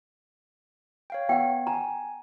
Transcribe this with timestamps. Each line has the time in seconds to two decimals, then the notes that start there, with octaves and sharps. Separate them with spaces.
1.10 C#5 F5 G5
1.29 B3 F#5 G5
1.67 G#5 A#5